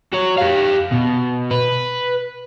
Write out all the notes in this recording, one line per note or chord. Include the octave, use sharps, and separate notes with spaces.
F#4 C#5
G4 F5
B2
B4